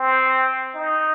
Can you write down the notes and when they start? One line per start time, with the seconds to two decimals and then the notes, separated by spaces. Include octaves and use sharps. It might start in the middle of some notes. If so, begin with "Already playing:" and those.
Already playing: C4
0.75 D#4